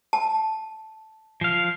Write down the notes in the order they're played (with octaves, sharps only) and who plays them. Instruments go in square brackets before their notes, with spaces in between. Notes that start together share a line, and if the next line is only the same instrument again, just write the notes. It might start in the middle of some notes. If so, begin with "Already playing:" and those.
[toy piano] A5
[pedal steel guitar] F3 F5